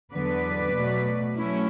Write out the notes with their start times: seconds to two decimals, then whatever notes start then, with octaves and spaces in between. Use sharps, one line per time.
0.12 E2 D3 F#3 B3 B4 D5
0.75 B2 F#3 A3
1.36 F#3 A3 C#4 E4